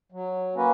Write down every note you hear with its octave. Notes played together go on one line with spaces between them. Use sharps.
F#3
A#3 C#4 F#4 B4